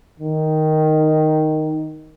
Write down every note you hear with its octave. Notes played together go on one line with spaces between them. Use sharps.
D#3